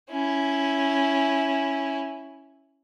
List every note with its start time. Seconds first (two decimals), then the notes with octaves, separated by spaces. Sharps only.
0.11 C#4 E4